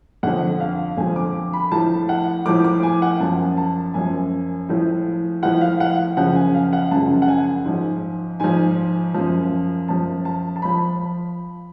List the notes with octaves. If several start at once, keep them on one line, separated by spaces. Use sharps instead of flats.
F2 D3 F3 F#5
F5
F2 D3 F3 G#5
D6
B5
A2 F3 A5
F#5
A2 F3 D6
D6
G#5
F#5
F#2 F3 A5
A5
F#2 F3 G#5
A2 F3
A2 F3 F#5
F5
F#5
F#2 C#3 F3 F#5
G#5
F5
F#5
F#2 C#3 F3 A5
F#5
G#5
G#2 F3
G#2 F3 G#5
F#2 F3
F#2 F3 A5
A5
A5
F3 B5